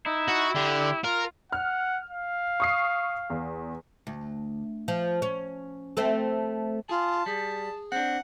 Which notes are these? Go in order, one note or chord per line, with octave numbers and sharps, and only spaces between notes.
D#4 E4
F#4
D3 G4
F4 A#4
F#5 F6
F5
C#6 D#6 C7
E2
D2
F3
C#4
A3 C4 A4
F4 G#4 A5
G3 G#4
C4 D4 F#5